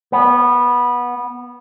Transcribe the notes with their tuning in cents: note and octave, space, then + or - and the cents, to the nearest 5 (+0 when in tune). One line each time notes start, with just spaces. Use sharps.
B3 -15